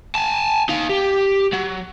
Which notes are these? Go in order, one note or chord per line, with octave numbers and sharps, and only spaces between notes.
G#5 A5
D#4 F5
G4
F#3